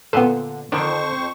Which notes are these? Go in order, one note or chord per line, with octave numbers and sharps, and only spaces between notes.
A#2 D3 B3 A4 B4 C5
F2 D3 D#3 D4 C5 C#6